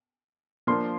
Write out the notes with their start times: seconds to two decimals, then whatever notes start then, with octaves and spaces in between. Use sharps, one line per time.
0.67 F3 A#3 D4 C6